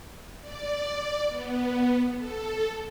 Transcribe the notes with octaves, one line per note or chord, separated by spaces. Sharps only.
D5
B3
A4